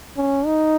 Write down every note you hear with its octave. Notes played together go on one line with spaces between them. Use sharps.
C#4
D#4